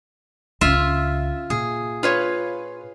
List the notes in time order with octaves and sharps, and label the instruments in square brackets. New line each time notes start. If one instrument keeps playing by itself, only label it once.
[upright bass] C#2 C#4 [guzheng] F4 E5
[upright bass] A#2 [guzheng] G#4
[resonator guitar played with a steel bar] F4 B4 C#5